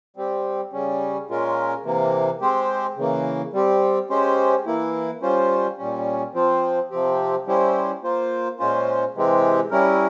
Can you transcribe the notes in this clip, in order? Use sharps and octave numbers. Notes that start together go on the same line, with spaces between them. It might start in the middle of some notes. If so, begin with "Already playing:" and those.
G3 C4 G4
C#3 G3 C#4
A#2 G#3 C#4 F4 A#4
C3 E3 A#3
G#3 C4 G4 C5
C#3 E3 A#3
G3 C4 G4
G#3 C#4 G4 C5
E3 A#3 E4
G3 C#4 F4 C5
A#2 G3 C#4
F3 C4 F4 C5
C3 F3 C4 G4
G3 C#4 E4 G4 C5
A#3 F4 C5
A#2 G#3 C#4 F4 C5
C3 E3 G#3 C4 G4
G3 C#4 E4 A#4